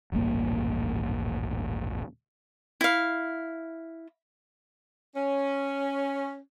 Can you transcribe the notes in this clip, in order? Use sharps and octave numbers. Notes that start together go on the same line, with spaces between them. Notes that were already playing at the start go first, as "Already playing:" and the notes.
D#1 A1 G2 A#3
E4 F5
C#4